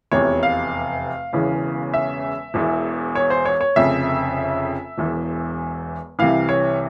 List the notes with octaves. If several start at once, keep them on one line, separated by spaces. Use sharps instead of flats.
F1 E2 C3 C#5
F5
E1 E2 C#3 E3
E5
E1 E2 E3
C#5
C5
C#5
C#5
F1 F2 C#3 E5
E1 E2 E3
C2 C3 E3 F5
C#5